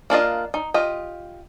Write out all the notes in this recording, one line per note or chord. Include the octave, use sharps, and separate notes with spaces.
A#3 D4 F4 D#5
D#4
F4 G4 D#5